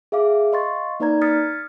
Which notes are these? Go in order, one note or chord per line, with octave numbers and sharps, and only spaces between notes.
G#4 E5 F5 D6
D#5 F5 C6 C#6 A6
A#3 D#4 B4 D5 A#5 G#6
D#6 F6 G#6 A6 B6 C#7